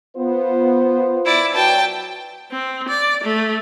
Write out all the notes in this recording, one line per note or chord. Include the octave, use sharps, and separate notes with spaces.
B3 F4 C5
E4 D5
F#3 B4 D5 G5 A5
C4
D5
A3